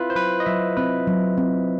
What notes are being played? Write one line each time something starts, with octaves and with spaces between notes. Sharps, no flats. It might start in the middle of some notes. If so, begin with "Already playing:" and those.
Already playing: C4 E4 F4 B4
C5
F#3 B4
D#5
F#3 E5
C4 B4
F#3
C4